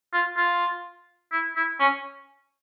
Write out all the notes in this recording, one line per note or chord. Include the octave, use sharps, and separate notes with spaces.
F4
F4
E4
E4
C#4